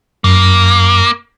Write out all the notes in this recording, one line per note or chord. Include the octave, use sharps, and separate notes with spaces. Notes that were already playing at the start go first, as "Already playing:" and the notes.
F#2 A#3